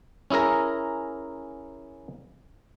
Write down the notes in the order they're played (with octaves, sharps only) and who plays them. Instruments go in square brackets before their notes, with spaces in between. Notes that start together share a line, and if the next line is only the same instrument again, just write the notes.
[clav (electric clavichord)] C#4 E4 G#4 A#4 A#5